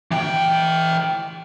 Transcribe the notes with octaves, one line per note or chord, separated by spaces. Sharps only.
E3 G5